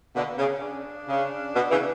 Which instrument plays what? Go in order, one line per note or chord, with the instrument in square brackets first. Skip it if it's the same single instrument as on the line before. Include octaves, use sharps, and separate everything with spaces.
[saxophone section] B2 D3 [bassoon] A#3
[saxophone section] C#3 [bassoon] C#4
[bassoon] D4
[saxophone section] C#3
B2
C#3 E3